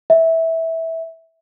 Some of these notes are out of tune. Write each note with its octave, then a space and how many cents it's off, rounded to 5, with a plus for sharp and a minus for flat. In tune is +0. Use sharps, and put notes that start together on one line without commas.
E5 -15